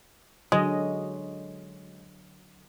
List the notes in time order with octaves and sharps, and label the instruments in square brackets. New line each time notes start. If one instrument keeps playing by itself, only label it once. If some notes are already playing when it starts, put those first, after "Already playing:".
[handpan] D3 F#3 D#5 [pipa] G#3